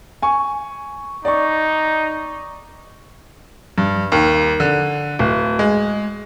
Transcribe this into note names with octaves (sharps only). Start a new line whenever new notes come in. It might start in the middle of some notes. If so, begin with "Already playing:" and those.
G#5 C#6
D#4 D5 C#6
G2
D#2
D3
D1
G#3